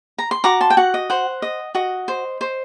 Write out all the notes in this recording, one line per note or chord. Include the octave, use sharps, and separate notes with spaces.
A#5
C6
F#4 A#5 D6
A5 C6
G5
F#4 F#5
D#5
C5 F#5
D#5
F#4 D#5
C5
C5